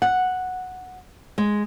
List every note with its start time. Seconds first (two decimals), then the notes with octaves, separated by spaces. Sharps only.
0.02 F#5
1.38 G#3